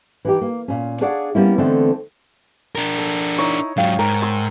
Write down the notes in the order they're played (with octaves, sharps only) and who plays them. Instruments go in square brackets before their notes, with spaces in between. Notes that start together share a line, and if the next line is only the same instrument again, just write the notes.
[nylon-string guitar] E3 D#4 G4
A#3
A#2 C#4
D4 G#4 C#5 D5 F5 F#5
G3 A#3 B3 C#4 E4
D3 E3 A3 B3 C4 D#4
[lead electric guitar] D4 A#4
[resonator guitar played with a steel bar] A4
[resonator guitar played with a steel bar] D#4 E4 [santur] C#5
[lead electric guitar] G#2 F#3 [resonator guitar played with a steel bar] F5 [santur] G5
[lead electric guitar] G#2 [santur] A#4 [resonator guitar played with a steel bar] G5
[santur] C6 E6